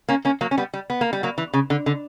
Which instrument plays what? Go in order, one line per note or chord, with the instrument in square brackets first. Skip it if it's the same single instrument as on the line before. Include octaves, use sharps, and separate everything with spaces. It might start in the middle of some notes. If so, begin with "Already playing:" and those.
[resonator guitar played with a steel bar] A#3 C#4
A#3 C#4
F#3 A#3
C#4
G3 B3
G3
B3
A#3
G3
F#3 A#3
E3
C#3
D3
D3